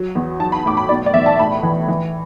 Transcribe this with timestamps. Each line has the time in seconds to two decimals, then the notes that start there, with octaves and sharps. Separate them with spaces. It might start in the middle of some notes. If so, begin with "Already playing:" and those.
Already playing: F#3
0.15 E2
0.40 F#3 A5
0.52 B5
0.66 A2 D6
0.77 B5
0.89 B2 D5
1.06 D5
1.14 E2 E5
1.26 A5
1.39 A2 B5
1.63 E3
1.88 E3